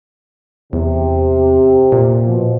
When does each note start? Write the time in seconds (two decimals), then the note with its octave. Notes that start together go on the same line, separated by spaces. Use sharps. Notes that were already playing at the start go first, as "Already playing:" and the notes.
0.73 E2 C3
1.92 A#2
2.25 B2 F3